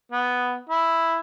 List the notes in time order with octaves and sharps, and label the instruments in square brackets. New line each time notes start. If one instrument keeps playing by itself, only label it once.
[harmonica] B3
E4